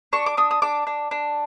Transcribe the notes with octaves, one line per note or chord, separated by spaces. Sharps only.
D4 C#6
D6
D4 D#6
D#6
D4 D6
D4
D4